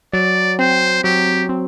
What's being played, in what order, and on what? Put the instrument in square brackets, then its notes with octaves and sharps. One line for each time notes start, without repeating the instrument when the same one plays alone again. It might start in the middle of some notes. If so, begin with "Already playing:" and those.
[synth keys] F#3 [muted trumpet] D5
[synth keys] C4 [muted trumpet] C5
[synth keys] F#3 [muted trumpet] G4
[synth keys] C4